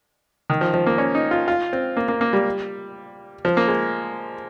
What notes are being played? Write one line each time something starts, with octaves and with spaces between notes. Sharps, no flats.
D#3
F3
F3
A#3
C#4
D#4
F4
F4
C4
A#3
A#3
A#3
G3
F3
A#3
G#3